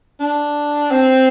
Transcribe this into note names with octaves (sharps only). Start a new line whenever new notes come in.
D4
C4